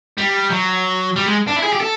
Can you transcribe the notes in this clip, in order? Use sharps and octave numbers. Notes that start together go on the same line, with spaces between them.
G3
F#3
G3
G#3
D4
E4
G#4
G4
A4